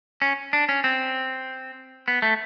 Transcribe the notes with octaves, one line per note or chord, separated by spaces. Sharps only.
C#4
D4
C#4
C4
B3
A3